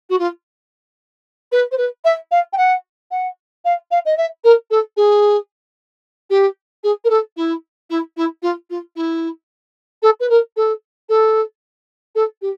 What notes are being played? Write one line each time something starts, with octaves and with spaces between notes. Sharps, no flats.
F#4
F4
B4
C5
B4
E5
F5
G5
F#5
F#5
F5
F5
D#5
E5
A#4
A4
G#4
G4
G#4
A#4
A4
E4
E4
E4
F4
F4
E4
A4
B4
A#4
A4
A4
A4
G4